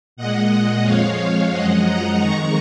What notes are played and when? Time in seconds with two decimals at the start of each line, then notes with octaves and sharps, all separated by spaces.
0.17 A#2 G#3 D#5 F#5
0.83 F2 F3 G#3 C#5 F5
1.51 F#2 F3 G#3 D#5 F#5
1.84 F#5 A#5
2.18 F2 D#3 G#3 A#5 C#6